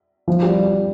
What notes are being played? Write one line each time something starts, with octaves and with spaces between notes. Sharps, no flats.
F3
G3